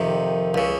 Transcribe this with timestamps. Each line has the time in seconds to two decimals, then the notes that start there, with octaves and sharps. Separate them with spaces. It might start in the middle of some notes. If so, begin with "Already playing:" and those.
Already playing: F2 C3 D#3
0.54 C#2 C#3